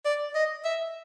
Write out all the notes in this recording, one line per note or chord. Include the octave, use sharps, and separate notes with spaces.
D5
D#5
E5